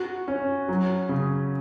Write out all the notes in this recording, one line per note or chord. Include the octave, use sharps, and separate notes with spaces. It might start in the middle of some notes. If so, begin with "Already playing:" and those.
Already playing: F#4
C#4
F#3
C#3